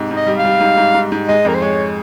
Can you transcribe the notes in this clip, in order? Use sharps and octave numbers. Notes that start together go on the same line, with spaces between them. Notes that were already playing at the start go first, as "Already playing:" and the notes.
Already playing: G#2 C3
G#2
D#5
G3
F5
G3
G#2
G#2
G#2
G#2
G#3 D#5
F2 A#4
C5
G#3 C#5